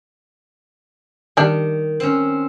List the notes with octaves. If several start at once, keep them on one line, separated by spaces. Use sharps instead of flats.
D#3 G3 D4
C4 C#4